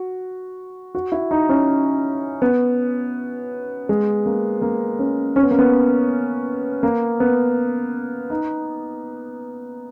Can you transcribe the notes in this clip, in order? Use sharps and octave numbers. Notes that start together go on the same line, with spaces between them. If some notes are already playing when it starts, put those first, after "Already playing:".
Already playing: F#4
F#4
E4
D#4
C#4
B3
G#3
A#3
A#3
C#4
C#4
B3
A#3
B3
A#3
B3
D#4